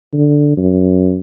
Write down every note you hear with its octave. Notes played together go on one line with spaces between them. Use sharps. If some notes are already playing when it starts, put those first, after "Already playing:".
D3
F#2